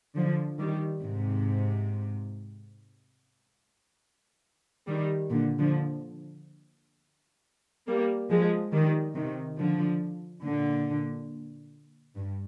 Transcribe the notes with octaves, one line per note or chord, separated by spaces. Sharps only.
D3 F3
D#3 G3
G#2 C3
D#3 G3
A#2 D3
D3 F3
G3 A#3
F3 G#3
D#3 G3
C3 D#3
D3 F3
A#2 D3
G2